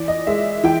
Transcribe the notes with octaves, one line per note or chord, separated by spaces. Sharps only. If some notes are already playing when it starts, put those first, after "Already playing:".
Already playing: E3 D5
D#5
G#3 E5
E3 G5